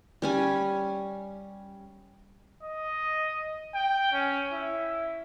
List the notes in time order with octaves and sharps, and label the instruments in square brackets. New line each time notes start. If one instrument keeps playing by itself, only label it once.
[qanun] G3 C#4 G#5
[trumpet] D#5
G5
C#4
E4